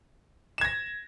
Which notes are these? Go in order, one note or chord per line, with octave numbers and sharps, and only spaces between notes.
G#6 A#6 E7